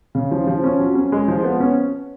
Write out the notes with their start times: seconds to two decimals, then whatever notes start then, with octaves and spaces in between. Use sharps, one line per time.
0.15 C#3
0.31 F3
0.47 F3
0.63 C#4
0.79 F#3
0.95 C#4
1.12 G#3
1.28 F3
1.44 B3
1.60 C#4